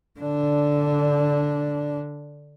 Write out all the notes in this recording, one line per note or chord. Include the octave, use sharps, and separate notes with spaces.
D3 D4